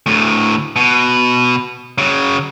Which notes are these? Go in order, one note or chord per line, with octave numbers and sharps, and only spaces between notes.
D2 A2
B2
C#3 F#3